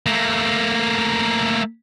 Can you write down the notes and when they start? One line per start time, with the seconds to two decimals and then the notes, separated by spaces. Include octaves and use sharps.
0.06 A3 A#3